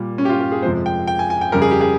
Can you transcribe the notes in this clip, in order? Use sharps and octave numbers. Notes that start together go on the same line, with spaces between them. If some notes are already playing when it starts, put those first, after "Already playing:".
Already playing: A#2 G3
C#4
G4
F4
G4
G#4
F2 C3 F3 G#3 C5
G5
G5
G#5
G#5
G5
F2 C#3 G3 A#4
G#4
G4
G#4